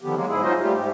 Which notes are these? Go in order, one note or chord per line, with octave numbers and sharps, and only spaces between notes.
D3 D#3 F3 B3 G4
F#3 G#3 A#3
G#2 E4 G#4
C#4 D#4 F4 F#4 C5 D#5
G3 A3 F4 G4
G#2 G4